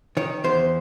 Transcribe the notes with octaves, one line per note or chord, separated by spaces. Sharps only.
D#3 C#5
E2 C5